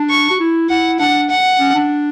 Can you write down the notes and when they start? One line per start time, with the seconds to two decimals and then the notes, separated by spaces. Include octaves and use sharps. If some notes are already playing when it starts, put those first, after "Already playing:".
Already playing: D4
0.10 C#6
0.30 F#4
0.40 E4
0.69 E4 F#5
1.00 D4 F#5
1.30 F#5
1.59 C#4
1.75 D4